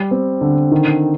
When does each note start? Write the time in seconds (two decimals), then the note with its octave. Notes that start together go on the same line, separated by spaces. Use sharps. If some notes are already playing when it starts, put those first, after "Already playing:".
Already playing: G3
0.11 C4
0.41 D3
0.72 D#3